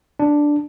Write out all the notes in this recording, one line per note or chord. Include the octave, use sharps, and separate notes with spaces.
D4